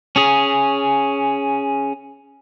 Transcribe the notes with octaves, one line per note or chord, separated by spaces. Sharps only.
C#4 G#4